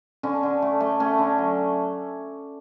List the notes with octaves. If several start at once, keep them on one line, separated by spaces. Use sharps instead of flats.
D3 C#4
D3
A3
A3
A3 C#4
D3
F#3